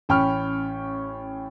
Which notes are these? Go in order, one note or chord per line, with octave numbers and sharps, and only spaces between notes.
A1 C#4 G5 B5 C#6 F6